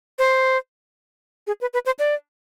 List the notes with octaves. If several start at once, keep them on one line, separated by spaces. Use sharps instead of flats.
C5
G#4
B4
B4
C5
D5